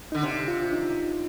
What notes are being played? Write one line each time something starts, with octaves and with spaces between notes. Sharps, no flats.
D3 D#4
C3 D4
F4
D#4